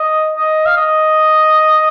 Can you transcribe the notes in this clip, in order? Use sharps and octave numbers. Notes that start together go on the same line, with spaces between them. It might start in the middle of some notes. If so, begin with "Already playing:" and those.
Already playing: D#5
D#5
F5
D#5